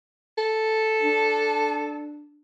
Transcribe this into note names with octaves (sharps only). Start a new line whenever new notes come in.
A4
D4